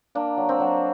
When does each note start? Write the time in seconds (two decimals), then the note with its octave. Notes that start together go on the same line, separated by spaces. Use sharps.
0.15 A#3 D4
0.37 F#3
0.49 C4
0.60 F#3